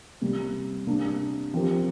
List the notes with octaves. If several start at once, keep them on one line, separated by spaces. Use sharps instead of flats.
C3 G3 A#3
C3 A#3 D4
F3 C4 G4 A#4